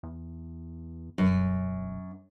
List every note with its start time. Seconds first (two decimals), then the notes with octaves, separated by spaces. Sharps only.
0.03 E2
1.18 E1 F#2